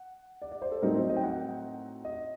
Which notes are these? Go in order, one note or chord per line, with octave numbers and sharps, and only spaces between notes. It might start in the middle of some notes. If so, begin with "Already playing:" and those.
Already playing: F#5
D5
D5
C5
A4
A2 F#3 C4 D#4 A#4
C5
D#5
G5
F#5
D#5